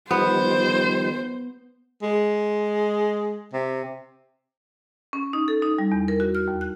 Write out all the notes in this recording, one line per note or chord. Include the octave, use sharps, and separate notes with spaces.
D#3 F3 G3 B3 C5
G#3
C3
C#4
D#4
A4
D#4
G3
E2
A#4
F#4
F6
D#2
F#6